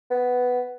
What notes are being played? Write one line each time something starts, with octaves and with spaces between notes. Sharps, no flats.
B3